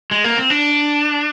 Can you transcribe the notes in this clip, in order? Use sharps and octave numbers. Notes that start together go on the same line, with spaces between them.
G#3
A#3
C4
D4